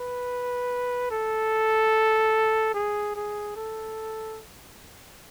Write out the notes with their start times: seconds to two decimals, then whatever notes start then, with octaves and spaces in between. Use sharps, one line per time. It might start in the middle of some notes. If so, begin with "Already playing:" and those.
Already playing: B4
1.11 A4
2.74 G#4
3.16 G#4
3.56 A4